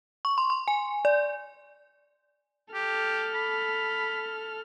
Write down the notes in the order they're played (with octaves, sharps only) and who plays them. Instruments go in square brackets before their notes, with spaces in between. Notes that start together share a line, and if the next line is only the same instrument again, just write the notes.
[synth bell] C#6
C6
C6
G#5
D5
[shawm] G4 [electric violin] A4 F6
[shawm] B5